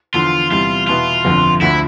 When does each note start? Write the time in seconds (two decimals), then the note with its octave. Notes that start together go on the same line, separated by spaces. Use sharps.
0.14 E2 D3 F3 F4
0.51 E2 C3 G3 F4
0.87 E2 B2 B3 E4 F4
1.25 G1 F2 D3
1.61 D2 D3 F3 A3 E4